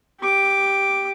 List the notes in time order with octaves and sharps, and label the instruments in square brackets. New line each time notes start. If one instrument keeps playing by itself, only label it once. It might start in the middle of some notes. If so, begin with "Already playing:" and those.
[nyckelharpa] G4 D6